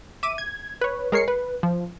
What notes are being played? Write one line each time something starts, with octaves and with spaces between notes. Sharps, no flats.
E5 D6 D#7
G#6
B4 C#5
G#3 A#4 C#5 C7 C#7
B4
F3